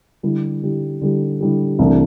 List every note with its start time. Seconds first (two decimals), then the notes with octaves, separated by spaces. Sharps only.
0.23 D3 G3 E4 G4
0.63 D3 G3 E4 G4
1.01 D3 G3 E4 G4
1.41 D3 G3 E4 G4
1.79 C2 C3 E3 A3 D4